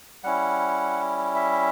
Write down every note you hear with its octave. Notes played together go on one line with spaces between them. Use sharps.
G3 C#4 E4 F#5
E5